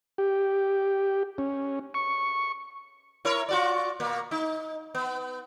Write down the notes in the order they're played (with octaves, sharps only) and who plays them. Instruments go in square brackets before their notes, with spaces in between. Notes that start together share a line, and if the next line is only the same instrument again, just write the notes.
[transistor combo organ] G4
C#4
C#6
[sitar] E4 A#4 C#5
F4 F#4 D5
B2 A#3
D#4
B3